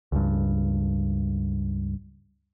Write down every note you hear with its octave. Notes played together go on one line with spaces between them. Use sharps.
C#2 G2